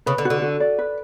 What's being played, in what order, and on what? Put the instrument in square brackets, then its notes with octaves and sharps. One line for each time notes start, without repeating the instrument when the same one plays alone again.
[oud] C#3 [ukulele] B4
[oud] D3
[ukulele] F#4
[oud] D3
[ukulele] F#4
D5
B4